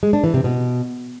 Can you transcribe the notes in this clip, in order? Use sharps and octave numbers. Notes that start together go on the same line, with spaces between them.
G#3
D4
E3
C3
B2